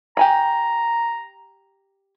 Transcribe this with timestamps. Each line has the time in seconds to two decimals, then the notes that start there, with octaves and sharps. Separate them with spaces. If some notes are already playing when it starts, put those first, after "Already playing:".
0.17 G4 G#5 A#5 B5